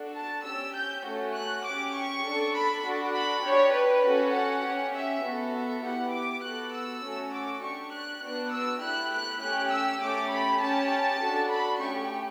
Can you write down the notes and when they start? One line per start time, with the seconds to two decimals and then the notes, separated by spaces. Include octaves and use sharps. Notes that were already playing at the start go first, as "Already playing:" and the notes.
Already playing: D4 F#4 A4
0.15 A5
0.45 C#4 G4 E6
0.75 G6
1.05 A3 C#4 F#4 A4
1.35 F#6
1.64 C#4 G4 D6
1.95 C#6
2.24 D4 A4
2.54 B5
2.84 D4 F#4 A4
3.14 B5
3.44 D4 G4 C#5
3.73 B4
4.03 C#4 F#4 A4
4.33 F#5
4.63 C#4 G4
4.93 E5
5.23 B3 F#4 A4
5.53 E5
5.83 B3 E4 G4 F#5
6.12 D6
6.42 B3 F#4 A4 F#6
6.73 E6
7.02 A3 C#4 F#4 A4
7.32 D6
7.61 D4 G4 C#6
7.91 F#6
8.21 B3 D4 F#4 F#6
8.51 E6
8.81 A3 E4 G4 F#6
9.12 F#6
9.40 A3 C#4 G4 F#6
9.71 E6
10.00 A3 C#4 G4 D6
10.30 B5
10.60 C#4 G4 A5
11.19 D4 F#4 A4
11.50 B5
11.80 A3 C#4 G4 C#6